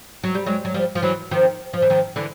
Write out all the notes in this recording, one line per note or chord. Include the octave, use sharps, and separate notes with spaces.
F#3
G3
F#3 G#3
F#3
F3 G3
F3
E3 F#3
D#3 F3
F3
E3
D#3 F3
D3 E3